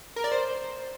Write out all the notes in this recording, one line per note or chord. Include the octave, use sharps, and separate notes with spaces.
A#4
D5
C5